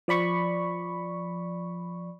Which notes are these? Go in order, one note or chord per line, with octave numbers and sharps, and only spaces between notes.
F3 D5 B5 C#6